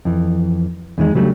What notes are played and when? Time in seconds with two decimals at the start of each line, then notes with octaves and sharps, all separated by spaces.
0.05 F2 E3
0.98 E2 D#3 G#3
1.15 C#3 F#3 G3 A3 D4